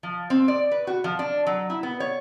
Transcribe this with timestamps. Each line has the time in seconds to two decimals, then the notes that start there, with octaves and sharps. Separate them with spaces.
0.03 F3
0.30 C4
0.48 D5
0.72 B4
0.87 F#4
1.04 F3
1.19 D4
1.47 F#3
1.70 E4
1.83 B3
2.00 C#5